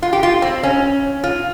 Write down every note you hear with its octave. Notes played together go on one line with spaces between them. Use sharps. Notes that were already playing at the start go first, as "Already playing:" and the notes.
F4
G4
F4
C4
C#4
F4